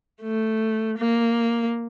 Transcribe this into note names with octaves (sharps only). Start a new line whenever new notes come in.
A3
A#3